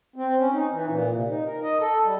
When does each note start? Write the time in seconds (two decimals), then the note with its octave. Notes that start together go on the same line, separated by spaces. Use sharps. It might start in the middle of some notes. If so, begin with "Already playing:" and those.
0.16 C4
0.38 C#4
0.52 D#4
0.72 E3
0.89 A#2
1.13 C3
1.28 D#4
1.46 A#4
1.63 D#5
1.80 A4
2.05 G3